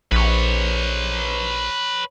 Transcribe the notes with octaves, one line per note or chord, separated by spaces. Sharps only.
A#1 B4 C#5